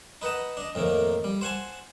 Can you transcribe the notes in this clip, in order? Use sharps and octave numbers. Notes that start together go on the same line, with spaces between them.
D#4 B4 D#5 F#5 A5
D4 D#5
F2 A2 D#3 A#3
G3
C5 F#5 G#5 A5